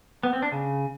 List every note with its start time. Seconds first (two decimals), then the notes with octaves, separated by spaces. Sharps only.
0.23 B3
0.33 C4
0.42 D4
0.52 C#3